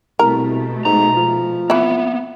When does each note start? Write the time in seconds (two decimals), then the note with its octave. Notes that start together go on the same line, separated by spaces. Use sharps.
0.19 C2 B2 A3 A#4
0.85 G#2 A#5
1.17 F3
1.70 E3 A#3 B3 E4